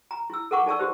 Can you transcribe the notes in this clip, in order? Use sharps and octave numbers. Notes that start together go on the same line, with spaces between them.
A#5
E4 E6
A4 A#4 F#5 C#6 D6
D#4 A4 D5 A5 C#6 E6
E4 F#4 G4 C5